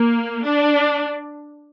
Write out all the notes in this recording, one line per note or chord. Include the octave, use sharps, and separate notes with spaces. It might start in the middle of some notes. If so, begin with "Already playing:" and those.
Already playing: A#3
D4